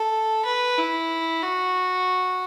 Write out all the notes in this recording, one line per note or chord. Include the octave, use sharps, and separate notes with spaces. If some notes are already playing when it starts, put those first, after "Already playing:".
Already playing: A4
B4
E4
F#4